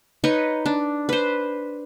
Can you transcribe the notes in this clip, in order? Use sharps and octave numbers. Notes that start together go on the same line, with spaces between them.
D#4 B4 C#5 D#5
D4
B4 C5